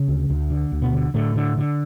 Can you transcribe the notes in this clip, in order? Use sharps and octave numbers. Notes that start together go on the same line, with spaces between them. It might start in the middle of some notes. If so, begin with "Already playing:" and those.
Already playing: C#3 C#4
D2
D2
D3
D2
B2 B3
D3
A2 D3 A3
D3
D3